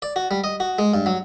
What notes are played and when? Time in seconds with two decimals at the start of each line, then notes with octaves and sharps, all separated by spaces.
0.02 D5
0.16 F#4
0.31 G3
0.44 D#5
0.60 F#4
0.79 G#3
0.94 G2
1.06 F#3